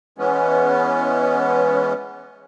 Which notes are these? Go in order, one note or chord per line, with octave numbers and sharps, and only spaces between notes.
E3 G#3 B3 C#4